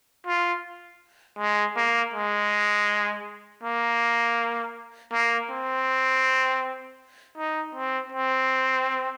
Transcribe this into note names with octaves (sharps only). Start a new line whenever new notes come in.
F4
G#3
A#3
G#3
A#3
A#3
C4
D#4
C4
C4